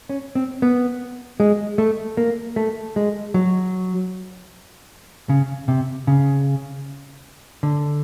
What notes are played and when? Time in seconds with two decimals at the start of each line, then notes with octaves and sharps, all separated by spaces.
0.09 C#4
0.35 C4
0.62 B3
1.40 G#3
1.78 A3
2.17 A#3
2.56 A3
2.96 G#3
3.34 F#3
5.29 C#3
5.68 C3
6.07 C#3
7.63 D3